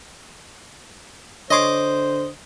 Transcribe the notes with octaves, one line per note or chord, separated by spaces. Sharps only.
D3 C5 C#5 D#5 C6 D6